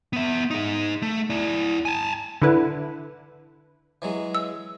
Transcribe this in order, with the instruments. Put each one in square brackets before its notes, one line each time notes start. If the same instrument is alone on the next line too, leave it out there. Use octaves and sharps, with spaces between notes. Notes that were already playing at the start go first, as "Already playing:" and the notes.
[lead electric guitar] B3 E5
D#4 G#4
A3
E4 D5
G#5 A5
[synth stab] D3 D4 E4 B4
[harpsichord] E3 F#3 G#3
[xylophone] E6